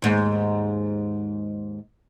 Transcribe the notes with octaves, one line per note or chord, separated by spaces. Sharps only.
D#2 G#2